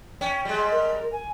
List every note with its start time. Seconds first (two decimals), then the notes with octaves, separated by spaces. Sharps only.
0.21 C#4 G5
0.45 G3 G#3
0.72 A#4
1.12 G#5